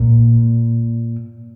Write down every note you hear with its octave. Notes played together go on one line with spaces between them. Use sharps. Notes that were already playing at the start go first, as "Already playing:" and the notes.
Already playing: A#2